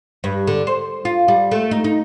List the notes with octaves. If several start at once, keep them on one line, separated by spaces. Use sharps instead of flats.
G2
D3
C5
F4
G3
A3
D#4
D#4